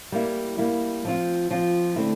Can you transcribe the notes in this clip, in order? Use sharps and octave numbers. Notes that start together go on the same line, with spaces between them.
G3 A#3 E4
G3 A#3 E4
F3 C4 F4
F3 C4 F4
D3 A3 C4 E4